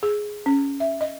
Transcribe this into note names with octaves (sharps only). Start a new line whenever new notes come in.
G#4
C#4
E5
D#5